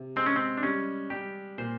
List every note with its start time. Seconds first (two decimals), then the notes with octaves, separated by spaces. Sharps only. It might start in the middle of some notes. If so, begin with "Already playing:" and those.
Already playing: C3
0.16 G#3 C4
0.26 C#4
0.36 C4
0.57 D4
0.63 G3 C#4
1.10 G3 G4
1.58 A#2 C5